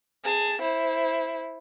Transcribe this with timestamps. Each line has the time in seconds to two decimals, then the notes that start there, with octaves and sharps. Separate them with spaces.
0.24 G#4 A5
0.61 E4 C5